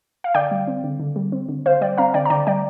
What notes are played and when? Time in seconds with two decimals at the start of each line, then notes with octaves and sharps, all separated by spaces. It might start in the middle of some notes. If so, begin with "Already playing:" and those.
0.24 F5
0.35 D3 D5 G5
0.51 G3
0.67 C4
0.84 D3
1.00 D3
1.16 G3
1.32 C4
1.49 D3
1.65 D3 C5 F5
1.81 G3 D5 G5
1.98 C4 F5 A#5
2.14 D3 D5 G5
2.25 A#5
2.30 D3 D5 G5
2.47 G3 D5 G5